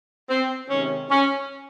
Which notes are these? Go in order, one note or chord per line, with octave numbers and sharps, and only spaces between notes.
C4
C3 D#3 G#3 C#4
C#4